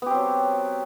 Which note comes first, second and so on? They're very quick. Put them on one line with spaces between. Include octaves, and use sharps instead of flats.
B3 G4 C4 F#3